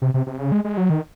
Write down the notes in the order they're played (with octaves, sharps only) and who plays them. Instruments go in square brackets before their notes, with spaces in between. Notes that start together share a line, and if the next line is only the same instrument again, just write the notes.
[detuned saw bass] C3
C3
C3
C#3
G#3
G#3
F#3
D#3